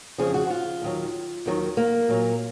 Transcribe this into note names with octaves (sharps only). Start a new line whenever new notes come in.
F2 C#3 F3 G#4
F#4
F4
D#2 D#3 F#3
D#2 D#3 F#3
A#3
A#2 F#3